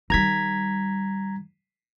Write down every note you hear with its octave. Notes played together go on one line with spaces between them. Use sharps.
D#3 G3 A#5 G#6 B6